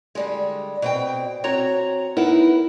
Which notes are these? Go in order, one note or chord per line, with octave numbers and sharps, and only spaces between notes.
D3 G3 G#3
B2 C4 G5
C4 F#4 C#5 A#5
B3 D#4 E4 A#4 B4 F#5